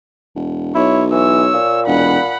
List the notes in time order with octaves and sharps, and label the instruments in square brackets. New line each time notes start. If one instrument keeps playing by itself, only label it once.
[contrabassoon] E1
[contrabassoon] B1 [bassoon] E4 [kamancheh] C#5
[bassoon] E3 [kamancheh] C#5 E6
[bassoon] A#2
[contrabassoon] E1 [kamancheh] F#5 B5